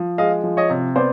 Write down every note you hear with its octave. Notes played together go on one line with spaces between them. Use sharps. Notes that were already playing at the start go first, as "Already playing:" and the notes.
Already playing: F3
G#3 D#5 F5
F3
C#5 D#5
C3
B3 C5 D5